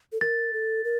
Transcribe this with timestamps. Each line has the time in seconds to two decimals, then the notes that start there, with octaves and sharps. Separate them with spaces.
0.12 A4
0.21 A#4 A6
0.53 A4
0.84 A#4